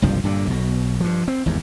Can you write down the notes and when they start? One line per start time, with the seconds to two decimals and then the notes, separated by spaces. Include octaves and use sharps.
0.02 F#1 C2 G2 F3
0.24 G2 A#2 D3
0.47 B1 B2
1.00 G2 F3
1.28 C4
1.46 G#1 E2 G2